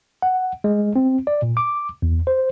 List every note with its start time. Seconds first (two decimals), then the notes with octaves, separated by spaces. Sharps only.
0.22 F#5
0.64 G#3
0.96 C4
1.27 D5
1.42 A#2
1.57 D6
2.02 E2
2.27 C5